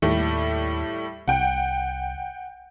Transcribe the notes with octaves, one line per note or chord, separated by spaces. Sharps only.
D#2 A2 G3 A3
C2 F#5 G5